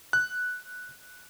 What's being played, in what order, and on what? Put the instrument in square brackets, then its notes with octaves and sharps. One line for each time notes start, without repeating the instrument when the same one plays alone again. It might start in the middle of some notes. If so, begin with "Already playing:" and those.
[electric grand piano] F#6